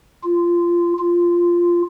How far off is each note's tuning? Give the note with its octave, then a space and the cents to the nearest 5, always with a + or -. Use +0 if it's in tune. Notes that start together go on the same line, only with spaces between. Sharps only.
F4 -15
F4 -5